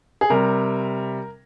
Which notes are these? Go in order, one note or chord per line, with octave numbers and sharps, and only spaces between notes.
G#4
C3 G3 A#4